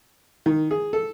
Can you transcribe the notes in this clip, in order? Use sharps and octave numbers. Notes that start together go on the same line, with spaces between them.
D#3
G#4
A4